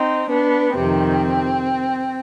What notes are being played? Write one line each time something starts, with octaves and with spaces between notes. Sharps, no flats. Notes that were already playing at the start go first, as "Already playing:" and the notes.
Already playing: C4 D#4
B3 D4
F2 C3 D#3 C4